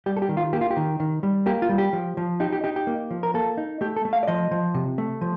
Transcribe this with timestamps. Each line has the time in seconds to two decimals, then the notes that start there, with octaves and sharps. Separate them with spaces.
0.06 G3 G4
0.17 A4
0.22 G4
0.29 D#3
0.37 F4
0.53 A#3 G4
0.61 F4
0.71 G4
0.77 D#3
1.00 D#3
1.23 G3
1.46 A#3 G4
1.62 F4
1.69 G3
1.78 G4
1.93 F3
2.17 F3
2.40 D#4 G4
2.53 G4
2.64 D#4 G4
2.76 G4
2.87 A#3
3.11 F3
3.23 A#4
3.34 A#3 A4
3.57 D#4
3.81 A3 G4
3.97 A4
4.05 A3
4.13 F5
4.23 D5
4.28 F3 D#5
4.51 F3
4.74 C3
4.98 A3
5.21 F3